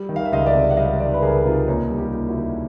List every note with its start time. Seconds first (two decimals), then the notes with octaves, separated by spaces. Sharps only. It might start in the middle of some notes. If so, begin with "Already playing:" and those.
Already playing: G3
0.09 D#3
0.16 F5
0.26 E5
0.32 C#2 D#5 F5
0.46 D5 E5
0.54 C3
0.70 F#5
0.77 G3 D#5 F5
1.00 D#3 D5 E5
1.14 B4
1.22 C#2 G#4 A#4
1.45 C3 D#4 F4
1.67 D#2 C#4 D#4
1.90 G3
1.98 F4 G4
2.14 D#2
2.28 E4 F#4
2.36 D3